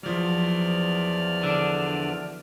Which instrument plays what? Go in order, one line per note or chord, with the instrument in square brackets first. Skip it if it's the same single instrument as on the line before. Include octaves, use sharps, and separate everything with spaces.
[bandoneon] E2 D5 F6 [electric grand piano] F3 F#3
[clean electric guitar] D3 D4